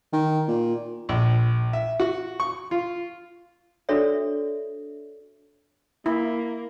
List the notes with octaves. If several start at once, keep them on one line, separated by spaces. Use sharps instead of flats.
D#3
A#2
A#1
E5
F#4
C#6
F4
D4 F#4 A4 C#5 D5 E5
A#3 E4